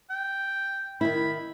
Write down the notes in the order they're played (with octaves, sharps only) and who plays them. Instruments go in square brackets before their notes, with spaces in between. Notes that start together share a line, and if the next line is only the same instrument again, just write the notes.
[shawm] G5
[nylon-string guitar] D#3 E4 [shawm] B5